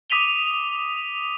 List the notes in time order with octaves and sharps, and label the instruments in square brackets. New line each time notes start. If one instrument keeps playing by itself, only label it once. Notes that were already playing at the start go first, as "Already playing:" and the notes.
[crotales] D6 D#6 B6 D#7 F7 G7